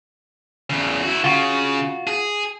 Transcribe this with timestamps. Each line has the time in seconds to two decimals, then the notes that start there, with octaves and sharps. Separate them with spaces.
0.70 E2 C#3
1.03 E4 F#4
1.24 C#3 F4 F#4
2.07 G#4